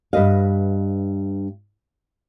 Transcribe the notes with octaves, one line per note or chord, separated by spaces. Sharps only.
G2 B4 D#5 F5